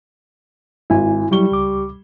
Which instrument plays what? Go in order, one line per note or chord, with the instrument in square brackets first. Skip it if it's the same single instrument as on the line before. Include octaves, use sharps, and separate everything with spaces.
[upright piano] G#1 [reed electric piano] E4 G#5
[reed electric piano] F#3 E4 [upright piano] G3 C#6 G7
[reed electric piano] C#2 D6